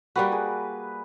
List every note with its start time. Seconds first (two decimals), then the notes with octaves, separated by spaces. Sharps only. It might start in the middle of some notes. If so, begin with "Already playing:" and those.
0.16 G3 A#3 F#4 B4 G5
0.32 G#4